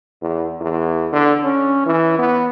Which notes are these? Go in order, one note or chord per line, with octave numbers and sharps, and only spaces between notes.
E2
E2
D3
C#4
E3
B3